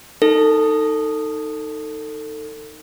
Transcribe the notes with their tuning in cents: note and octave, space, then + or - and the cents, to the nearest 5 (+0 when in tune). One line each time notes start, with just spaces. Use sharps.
D#4 +0 A4 +25